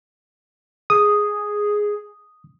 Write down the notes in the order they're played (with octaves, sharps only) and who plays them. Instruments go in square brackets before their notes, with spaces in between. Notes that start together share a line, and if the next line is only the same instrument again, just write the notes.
[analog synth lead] G#4 [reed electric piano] D#6